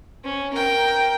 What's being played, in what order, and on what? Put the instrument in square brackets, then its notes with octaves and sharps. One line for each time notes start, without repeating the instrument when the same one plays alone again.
[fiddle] C#4
A#4 G5